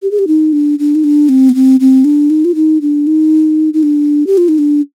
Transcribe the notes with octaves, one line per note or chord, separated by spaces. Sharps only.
G4
G#4
G4
D#4
D4
D4
D#4
D4
C4
B3
C4
C4
D4
D#4
F4
D#4
D4
D#4
D#4
D4
G4
F4
D#4
D4